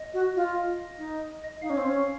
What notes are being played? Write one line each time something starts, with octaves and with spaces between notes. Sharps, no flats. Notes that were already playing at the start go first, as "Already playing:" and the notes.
Already playing: D#5
F#4
F4
D#4
D#4 F5
C#4
C4
C#4